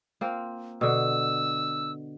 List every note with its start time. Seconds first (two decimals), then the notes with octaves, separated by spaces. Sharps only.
0.21 A#3 C4 F4
0.81 B2 D3 E6